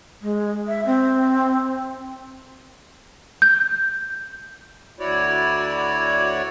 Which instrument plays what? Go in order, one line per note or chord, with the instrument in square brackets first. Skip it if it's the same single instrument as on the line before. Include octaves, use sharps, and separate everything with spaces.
[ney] G#3
E5
C4
[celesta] G6
[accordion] D2 E4 F#4 C#5 D5